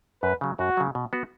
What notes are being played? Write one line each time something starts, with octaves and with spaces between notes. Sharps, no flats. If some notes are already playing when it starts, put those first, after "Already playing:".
F#2 B4
C#3 F#3
F#2 F#4
C#3 F#3
B2
B3 F#4